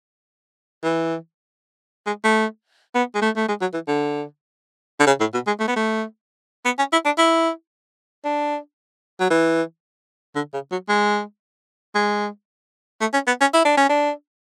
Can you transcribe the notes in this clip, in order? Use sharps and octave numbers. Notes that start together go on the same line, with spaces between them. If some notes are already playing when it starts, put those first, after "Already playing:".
E3
G#3
A3
B3
G#3
A3
A3
G#3
F#3
E3
D3
D3
C#3
A2
B2
G#3
A3
B3
A3
B3
C#4
E4
D4
E4
D4
F#3
E3
D3
C#3
F#3
G#3
G#3
A3
C#4
B3
C#4
E4
D4
C#4
D4